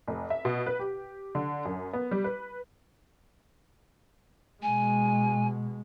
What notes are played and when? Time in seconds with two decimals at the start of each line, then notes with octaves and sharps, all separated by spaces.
0.08 F1
0.30 E5
0.45 B2
0.66 B4
0.79 G4
1.35 D3
1.65 F#2
1.93 B3
2.11 G3
2.24 B4
4.63 B2 G#3 G#5